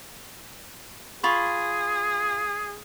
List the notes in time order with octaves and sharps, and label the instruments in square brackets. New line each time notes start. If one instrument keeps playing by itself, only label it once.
[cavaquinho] F4 B5 C#6 [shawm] G#4